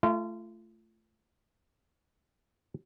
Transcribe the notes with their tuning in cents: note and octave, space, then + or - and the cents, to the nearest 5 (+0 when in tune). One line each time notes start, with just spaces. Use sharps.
A3 +0 F4 -30